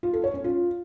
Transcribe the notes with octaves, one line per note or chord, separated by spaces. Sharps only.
F4
A4
C#5
C#4
F4